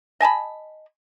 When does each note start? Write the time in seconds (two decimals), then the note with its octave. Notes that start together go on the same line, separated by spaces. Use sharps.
0.20 D#5 G#5 A5 B5